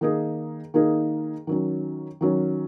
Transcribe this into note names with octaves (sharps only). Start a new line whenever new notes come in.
D#3 A#3 D#4 G#4
D#3 A#3 D#4 G#4
D#3 F#3 C#4
D#3 F#3 C#4